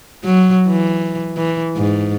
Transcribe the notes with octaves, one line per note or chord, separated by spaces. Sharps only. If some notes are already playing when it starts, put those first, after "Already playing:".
F#3
E3
E3
G#2